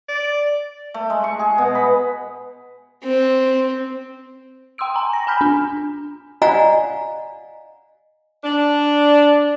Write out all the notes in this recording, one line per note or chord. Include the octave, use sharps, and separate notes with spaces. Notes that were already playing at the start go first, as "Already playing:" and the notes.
D5
A3
G#3
C#6
G#4
B2
B5
C4
G5 C6 D#6 E6 D7
G#5 A#5
A#6
G#5 B5 F6 G6 B6
D4
D5 D#5 F5 F#5 G#5 A#5
D4